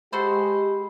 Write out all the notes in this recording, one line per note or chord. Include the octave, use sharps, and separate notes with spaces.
G#3 F#4 G4 A4 C5 B5 C7